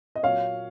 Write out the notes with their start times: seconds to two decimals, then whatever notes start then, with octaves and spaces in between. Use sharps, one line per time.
0.15 D#5
0.23 A#2 F#3 A#3 C#5 F5